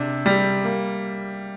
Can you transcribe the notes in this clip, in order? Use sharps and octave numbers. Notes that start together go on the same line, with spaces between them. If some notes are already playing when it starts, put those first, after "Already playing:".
Already playing: C3 D4
G3
A#3